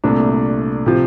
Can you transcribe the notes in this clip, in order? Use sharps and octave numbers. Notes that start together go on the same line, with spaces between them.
C2 A#2 A3 D4
C3 F3